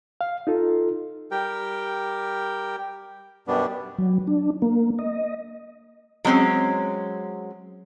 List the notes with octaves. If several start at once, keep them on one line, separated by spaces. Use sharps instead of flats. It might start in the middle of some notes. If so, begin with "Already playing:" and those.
F5
D#4 F4 A4
G3 G4 A#4 G5
F#2 B2 G3 B3 D4
F#3
D4
A#3
D#5
F#3 G#3 C4 C#4